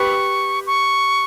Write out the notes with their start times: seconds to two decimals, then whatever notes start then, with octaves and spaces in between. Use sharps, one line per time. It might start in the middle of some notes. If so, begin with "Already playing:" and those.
Already playing: G4 B4 C#6
0.67 C#6